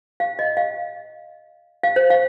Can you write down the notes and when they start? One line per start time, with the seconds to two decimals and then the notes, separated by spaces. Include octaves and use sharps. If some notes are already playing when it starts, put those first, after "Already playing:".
0.20 F5
0.39 D#5
0.57 F5
1.83 F5
1.96 C5
2.10 F5